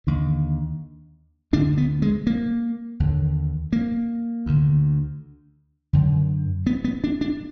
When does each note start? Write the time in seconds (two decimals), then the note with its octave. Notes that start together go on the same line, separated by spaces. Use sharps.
0.07 D#2 D3
1.53 D2 D3 D4
1.78 B3
2.02 G#3
2.27 A#3
3.00 D#2 D3
3.73 A#3
4.46 D2 D3
5.93 F#2 D3
6.66 B3
6.84 B3
7.04 D4
7.21 D4